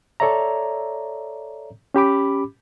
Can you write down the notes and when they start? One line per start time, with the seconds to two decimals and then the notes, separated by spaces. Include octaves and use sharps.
0.20 A4 C#5 D5 E5 A#5
1.94 C#4 G4 B5 D6